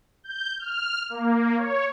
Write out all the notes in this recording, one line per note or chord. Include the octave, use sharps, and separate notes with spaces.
G6
F6
A#3
C#5